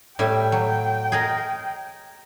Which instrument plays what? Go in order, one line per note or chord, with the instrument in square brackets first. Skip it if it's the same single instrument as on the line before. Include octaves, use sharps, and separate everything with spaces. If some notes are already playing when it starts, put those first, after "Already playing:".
[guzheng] A2 G3 E5 [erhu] G5
[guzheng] F#3
G#4 A#4 D#5